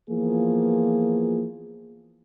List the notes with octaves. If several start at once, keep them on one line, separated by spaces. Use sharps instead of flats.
E3 F3 A#3 B3 F4 G#4